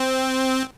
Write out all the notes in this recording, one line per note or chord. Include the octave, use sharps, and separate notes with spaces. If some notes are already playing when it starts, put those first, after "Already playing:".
Already playing: C4